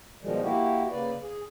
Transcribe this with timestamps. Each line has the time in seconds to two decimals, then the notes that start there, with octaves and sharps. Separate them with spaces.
0.22 B2 D#3 F3 G3 G#3
0.42 A#3 E4 F#4 G4
0.91 C#3 A#3 B4 D5
1.21 G#4